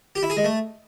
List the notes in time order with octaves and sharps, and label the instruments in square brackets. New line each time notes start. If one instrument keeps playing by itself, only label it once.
[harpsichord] G4
E4
G#4
G#3
A3